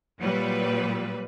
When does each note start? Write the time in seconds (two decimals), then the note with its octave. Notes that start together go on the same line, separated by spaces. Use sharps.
0.18 A#2 F#3 G3 B4